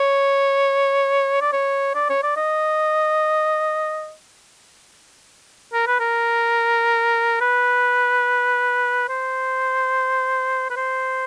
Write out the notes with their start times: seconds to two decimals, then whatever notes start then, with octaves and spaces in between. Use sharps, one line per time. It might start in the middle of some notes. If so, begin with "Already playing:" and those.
Already playing: C#5
1.42 D5
1.53 C#5
1.95 D5
2.10 C#5
2.23 D5
2.37 D#5
5.73 A#4
5.87 B4
6.00 A#4
7.41 B4
9.09 C5
10.71 B4
10.77 C5